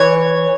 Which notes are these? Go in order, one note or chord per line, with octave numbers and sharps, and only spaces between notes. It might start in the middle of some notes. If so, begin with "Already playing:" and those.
Already playing: E3 C#5